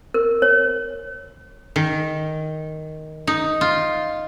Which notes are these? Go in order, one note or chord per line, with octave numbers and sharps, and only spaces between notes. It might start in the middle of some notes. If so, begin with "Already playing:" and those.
A#4
C#5
D#3
D#4
F4